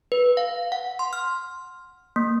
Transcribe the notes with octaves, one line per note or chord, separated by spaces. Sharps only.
B4
F5
F#5
C6
F6
A#3